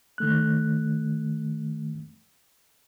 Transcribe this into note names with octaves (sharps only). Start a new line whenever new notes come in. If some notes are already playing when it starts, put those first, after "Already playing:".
D#3 A3 F#6